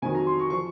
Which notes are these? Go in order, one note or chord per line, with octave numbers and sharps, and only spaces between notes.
F2 D#3 F#3 G#5
A#5
C6
C#6
F3 C#6